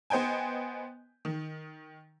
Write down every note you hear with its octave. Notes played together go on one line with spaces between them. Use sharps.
B3 C5 D#5 G5 G#5
D#3